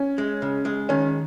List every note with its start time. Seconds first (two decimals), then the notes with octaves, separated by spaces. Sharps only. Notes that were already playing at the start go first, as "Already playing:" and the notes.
Already playing: C#4
0.18 G#3
0.42 C#3
0.65 G#3
0.89 D#3 C#4